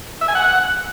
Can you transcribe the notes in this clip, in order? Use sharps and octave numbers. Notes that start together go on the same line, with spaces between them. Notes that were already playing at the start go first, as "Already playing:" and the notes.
E5
G#5
F#5